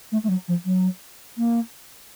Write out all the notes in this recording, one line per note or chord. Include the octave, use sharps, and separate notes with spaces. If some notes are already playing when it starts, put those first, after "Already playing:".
A3
A3
F#3
F3
F#3
A#3